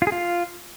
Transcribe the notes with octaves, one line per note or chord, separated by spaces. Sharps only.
F4
G#4
F4